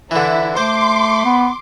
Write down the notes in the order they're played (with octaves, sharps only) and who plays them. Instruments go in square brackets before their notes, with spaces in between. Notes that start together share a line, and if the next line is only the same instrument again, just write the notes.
[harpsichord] D3 E3 [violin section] E4
[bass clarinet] A3 [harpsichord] C5 [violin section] C6 D6
[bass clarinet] B3